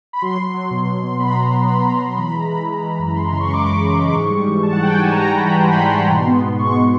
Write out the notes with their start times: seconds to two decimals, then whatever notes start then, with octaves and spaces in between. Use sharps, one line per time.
0.13 B5
0.22 F#3 C6
0.38 F#3
0.54 F#3
0.71 B2
0.87 B2
1.04 B3
1.19 B3 B5
1.31 B2 A#5
1.41 B5
1.53 B3
1.69 F#3 B5
1.81 F#3 A#5
1.93 B5
2.02 B2 C6
2.17 E3 B5
2.30 G#3 A#5
2.40 B5
2.51 E3
2.67 G#3
2.83 E3
2.99 F#2
3.16 G#3 C6
3.28 C#3 C6
3.40 C#6
3.49 G#3 D6
3.65 F#2
3.81 C#3
3.98 G#3
4.05 D6
4.14 G#2 C#6
4.30 G3
4.47 E3
4.63 G#2 A5
4.73 F#5
4.79 G#2 G5
4.93 G3 G#5
5.02 A5
5.12 G#2 A#5
5.28 G#2
5.36 B5
5.45 E3
5.61 G3 C6
5.71 B5
5.77 G#2 C6
5.94 G#2
6.10 B2 C6
6.27 B3
6.43 B2
6.59 G#3 C#6
6.75 B2